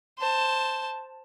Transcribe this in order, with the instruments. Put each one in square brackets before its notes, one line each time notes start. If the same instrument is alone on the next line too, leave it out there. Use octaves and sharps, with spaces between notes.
[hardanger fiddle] C5 A5